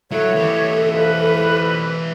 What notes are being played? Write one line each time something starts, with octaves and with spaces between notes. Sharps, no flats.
F#3 E4 A4 C#5
E3 G4
F2 B4